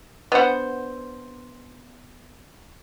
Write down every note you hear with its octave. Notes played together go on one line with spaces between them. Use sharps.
B3 D4 C5 F#5